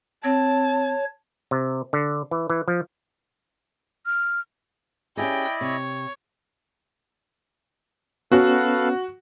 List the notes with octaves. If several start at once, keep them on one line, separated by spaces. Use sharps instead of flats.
C4 C#5 A5
C3
D3
E3
E3
F3
F6
C#4 E4 G4 G#4 D5 D#5 G5
C3 C#5
B3 C#4 F#4 A4 B4 F5